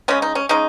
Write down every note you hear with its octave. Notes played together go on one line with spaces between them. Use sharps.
C#3 G#3 C#4
D#4
C#4
C#3 G#3 D#4